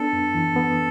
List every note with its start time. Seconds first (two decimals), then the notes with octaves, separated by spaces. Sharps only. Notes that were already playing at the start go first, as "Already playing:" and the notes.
Already playing: B3 D4 A4
0.13 F#2
0.35 E3
0.56 B3